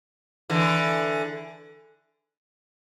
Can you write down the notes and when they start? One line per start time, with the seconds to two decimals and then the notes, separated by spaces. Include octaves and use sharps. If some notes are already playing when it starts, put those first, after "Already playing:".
0.50 D3 E3